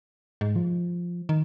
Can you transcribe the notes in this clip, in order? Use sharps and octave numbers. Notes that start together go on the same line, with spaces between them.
G#2
F3
D#3